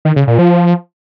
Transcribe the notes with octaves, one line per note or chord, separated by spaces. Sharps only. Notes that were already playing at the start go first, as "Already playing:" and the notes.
D#3
C#3
A#2
F3